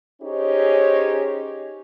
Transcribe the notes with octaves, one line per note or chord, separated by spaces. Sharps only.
C#4 D#4 G4 G#4 C5 C#5